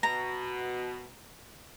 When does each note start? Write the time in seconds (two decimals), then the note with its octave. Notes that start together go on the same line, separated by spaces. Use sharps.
0.03 B2 A#5